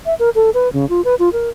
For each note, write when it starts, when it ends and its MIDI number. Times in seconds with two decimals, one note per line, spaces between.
0.06 0.14 76
0.19 0.30 70
0.35 0.50 69
0.54 0.71 71
0.73 0.88 49
0.89 1.04 65
1.04 1.15 71
1.19 1.29 65
1.33 1.49 70